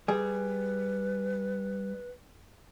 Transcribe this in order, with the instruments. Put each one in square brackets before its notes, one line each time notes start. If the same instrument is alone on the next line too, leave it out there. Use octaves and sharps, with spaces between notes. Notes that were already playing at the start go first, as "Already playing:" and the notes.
[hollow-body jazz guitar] G3 G#4 [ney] B4